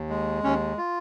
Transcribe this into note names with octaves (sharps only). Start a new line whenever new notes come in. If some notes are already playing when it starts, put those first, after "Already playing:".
Already playing: D#2
G#3
D#2 C#4
F4